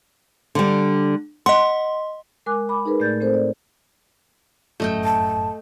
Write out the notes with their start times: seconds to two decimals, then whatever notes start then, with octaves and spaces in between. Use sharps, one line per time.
0.55 D3 G3
1.46 D#5 F#5 C6
2.46 G#3 A#4 G#5 D6 F#6
2.68 G#5 B5 D6
2.86 D#4 G#4 A#4 B4
2.99 A2 A3 D5 G6 A6
3.21 A3 C4 A4 A#4 C5
3.34 D5
4.80 G1 F#2 A2 A3 D#5 G5
5.04 A5